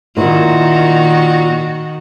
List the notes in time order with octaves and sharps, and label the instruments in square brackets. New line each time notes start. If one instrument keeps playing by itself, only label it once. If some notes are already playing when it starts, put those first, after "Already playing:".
[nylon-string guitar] A#2 E4 [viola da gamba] D#3 F#4